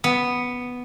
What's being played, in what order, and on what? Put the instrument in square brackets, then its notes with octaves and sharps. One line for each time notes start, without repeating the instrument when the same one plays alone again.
[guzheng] B3